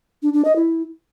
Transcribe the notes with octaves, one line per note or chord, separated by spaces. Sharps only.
D4
D4
D#5
E4